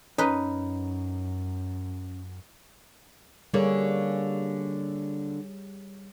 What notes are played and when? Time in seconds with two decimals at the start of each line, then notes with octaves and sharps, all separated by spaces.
0.18 F#2 C#4 D#4 B4
3.54 D3 G3 A#3 G#4 C#5